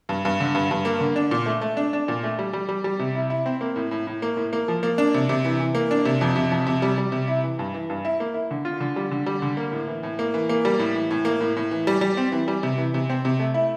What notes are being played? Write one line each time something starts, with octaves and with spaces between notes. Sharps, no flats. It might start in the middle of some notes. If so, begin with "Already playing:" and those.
G2
G2
D3
G2
G2
A#3
D3
D4
A#2
A3
A3
D4
D4
A#2
A3
G3
G3
G3
G3
C3
E4
E4
C4
A#3
A2
A2
A2
A#3
A2
A#3
F3
A#3
D4
C3
C3
E3
E3
A#3
D4
C3
F2
C3
F2
C3
G3
G3
C3
E4
E3
G2
E3
G2
E4
A#3
E4
D3
F4
D3
G3
D3
G3
D3
A#3
A2
E3
A2
A#3
E3
A#3
G3
A2
E3
A2
A#3
A2
A2
E3
G3
G3
C4
E3
G3
C3
E3
C3
C4
C3
A3
E4